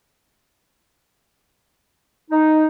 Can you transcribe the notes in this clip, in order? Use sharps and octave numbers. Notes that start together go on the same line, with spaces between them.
D#4